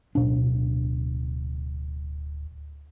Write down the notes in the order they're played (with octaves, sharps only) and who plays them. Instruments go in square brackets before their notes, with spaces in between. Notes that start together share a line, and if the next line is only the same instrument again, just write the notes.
[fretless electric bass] D1 B2 D4